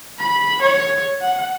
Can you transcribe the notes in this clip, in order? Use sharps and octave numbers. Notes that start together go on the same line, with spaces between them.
B5
C#5
F#5